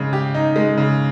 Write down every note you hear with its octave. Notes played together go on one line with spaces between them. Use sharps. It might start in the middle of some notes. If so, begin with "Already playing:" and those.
Already playing: C#3 G#3
G4
D#4
G#3
C#3